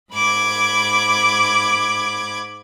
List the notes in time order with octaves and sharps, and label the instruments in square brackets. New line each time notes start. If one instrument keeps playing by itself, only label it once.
[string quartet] G#2 B5 D6 G#6